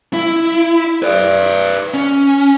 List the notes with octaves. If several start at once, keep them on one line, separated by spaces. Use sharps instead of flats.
E4
B4 D5
C#4